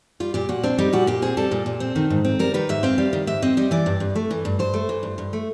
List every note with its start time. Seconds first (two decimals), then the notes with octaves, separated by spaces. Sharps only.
0.20 G3 F4
0.34 A#2 G4
0.49 A#2 F#4
0.64 C4 D4
0.78 G3 D#4
0.93 A#2 F#4
1.07 A#2 G4
1.22 C4 G#4
1.37 G3 A4
1.51 A#2
1.66 A#2
1.80 C4
1.96 D#3
2.10 G#2
2.25 C4
2.39 G3 A#4
2.54 D#3 B4
2.69 G#2 E5
2.83 C4 F5
2.98 G3
3.13 D#3
3.27 G#2 E5
3.42 C4 D#5
3.57 G3 D#5
3.71 E3 D5
3.86 G2
4.00 G2
4.15 A3
4.31 E3
4.45 G2
4.59 G2 C5
4.74 A3
4.89 E3
5.03 G2
5.18 G2
5.33 A3